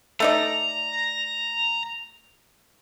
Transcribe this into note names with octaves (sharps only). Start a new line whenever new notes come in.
A3 D#4 D5 A#5